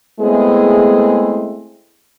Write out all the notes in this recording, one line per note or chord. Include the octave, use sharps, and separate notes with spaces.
G#3 A3 B3 C4 E4 G#4